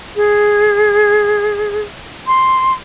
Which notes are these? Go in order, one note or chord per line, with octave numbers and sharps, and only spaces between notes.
G#4
C6